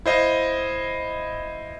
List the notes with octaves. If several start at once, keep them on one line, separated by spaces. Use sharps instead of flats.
E4 C5 D#5 F5